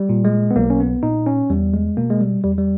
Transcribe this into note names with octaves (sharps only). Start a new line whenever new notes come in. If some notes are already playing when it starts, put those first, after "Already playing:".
Already playing: G3
A#2
G#3
B3
B1 A#3
C#4
B3
A#2 D#4
C#4
E2 G3
G#3
B2 A#3
G#3
G3
E2 G3
G3